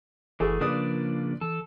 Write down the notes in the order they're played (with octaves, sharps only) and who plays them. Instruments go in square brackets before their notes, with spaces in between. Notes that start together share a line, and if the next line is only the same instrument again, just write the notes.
[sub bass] F#1 [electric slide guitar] E3 [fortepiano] A3 F#4 G#4
[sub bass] C#3 [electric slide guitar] F3 A#3 D4 [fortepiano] B4 D5 D#6
[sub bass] E3 [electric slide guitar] A4